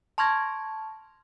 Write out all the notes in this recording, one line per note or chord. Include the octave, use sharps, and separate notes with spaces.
A5 C6 C#6 F6 G#6 A#6